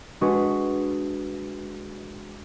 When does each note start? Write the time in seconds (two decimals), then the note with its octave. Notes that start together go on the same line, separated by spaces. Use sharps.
0.21 G#3 D4 F#4 G#4 B4